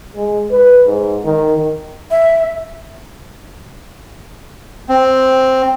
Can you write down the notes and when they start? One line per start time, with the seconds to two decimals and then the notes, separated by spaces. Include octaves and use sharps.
0.16 G#3
0.51 B4
0.86 G#2
1.25 D#3
2.11 E5
4.89 C4